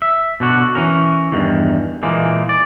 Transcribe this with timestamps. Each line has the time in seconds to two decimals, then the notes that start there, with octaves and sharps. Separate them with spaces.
0.02 E5
0.40 B2 D3 F#4
0.75 E3 C#4 A#4
1.32 E2 G2 D#3
2.03 A#2 E3 G#3 A#3
2.49 D5